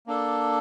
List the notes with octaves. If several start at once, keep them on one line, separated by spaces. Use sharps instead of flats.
A#3 D4 A4